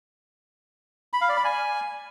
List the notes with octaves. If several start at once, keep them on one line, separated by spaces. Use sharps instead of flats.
B5
F5
D5
B5
G#5